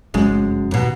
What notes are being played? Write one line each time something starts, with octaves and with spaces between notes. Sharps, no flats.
F1 F#2 G#3
D#2 B2